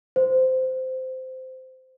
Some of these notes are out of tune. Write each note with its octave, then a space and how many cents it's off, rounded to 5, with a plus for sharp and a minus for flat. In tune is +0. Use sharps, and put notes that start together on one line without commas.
C5 -15